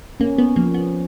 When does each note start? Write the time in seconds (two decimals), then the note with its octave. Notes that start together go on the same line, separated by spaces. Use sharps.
0.20 A#3 C#4
0.38 B3
0.56 F3 A#3
0.74 B3